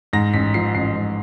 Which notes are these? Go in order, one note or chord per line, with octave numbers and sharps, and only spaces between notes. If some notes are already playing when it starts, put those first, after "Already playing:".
G#2 A#6
A1 B6
F3 C7
A1 C7
G#2